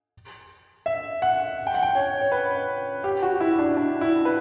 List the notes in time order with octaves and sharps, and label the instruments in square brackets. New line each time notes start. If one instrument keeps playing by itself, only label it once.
[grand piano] E5
F#5
G5
F#5
G5
C#5
C#5
B4
G4
F#4
E4
D4
D4
E4
B4